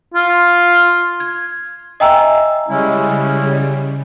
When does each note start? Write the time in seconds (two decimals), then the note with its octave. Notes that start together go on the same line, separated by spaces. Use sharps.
0.14 F4
1.20 G#6
2.00 D#5 E5 G5 G#5 A#5 E6
2.68 C#3 G3 G#3 C#4 E4